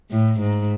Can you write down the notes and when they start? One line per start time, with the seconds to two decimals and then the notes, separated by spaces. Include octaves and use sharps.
0.11 A2
0.40 G#2